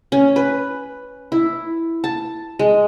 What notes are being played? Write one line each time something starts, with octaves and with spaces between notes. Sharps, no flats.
C#4
B4
E4
A5
G#3